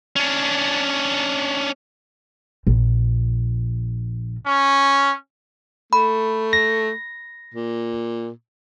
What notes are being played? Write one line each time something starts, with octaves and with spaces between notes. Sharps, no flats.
C#4 D4
A#1
C#4
A3 B5
A#6
A#2